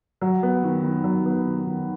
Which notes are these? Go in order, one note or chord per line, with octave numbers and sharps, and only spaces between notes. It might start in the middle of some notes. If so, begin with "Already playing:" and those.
F#3
B3
D#3
D#3
F#3
B3
D#3
D#3